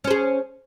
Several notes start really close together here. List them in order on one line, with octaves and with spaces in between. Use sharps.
C#4 C5 G#4